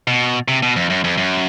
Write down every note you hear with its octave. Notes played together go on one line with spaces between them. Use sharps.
B2
C3
B2
F2
F#2
F2
F#2